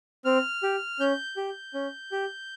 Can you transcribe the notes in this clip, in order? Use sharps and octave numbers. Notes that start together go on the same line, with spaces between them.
C4 F6
G4
C#4 G6
G4
C#4
G4